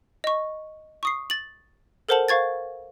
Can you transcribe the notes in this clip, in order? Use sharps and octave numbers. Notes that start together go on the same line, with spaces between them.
D#5 C#6
C#6 D#6 C7
A6 F#7
A4 A#4 C5 F#5 A5 F#7
C5 F5 C#6 G#6 A6